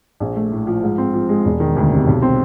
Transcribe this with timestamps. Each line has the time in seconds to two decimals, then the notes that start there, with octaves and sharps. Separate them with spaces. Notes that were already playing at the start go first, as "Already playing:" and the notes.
0.20 A#1
0.36 A3
0.52 A2
0.67 F3
0.83 G#2
0.98 C4
1.14 F3
1.29 G#3
1.45 E1
1.60 D#3
1.76 D2
1.92 C3
2.07 B1
2.22 C4